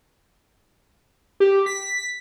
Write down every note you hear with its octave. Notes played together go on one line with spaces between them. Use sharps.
G4
B6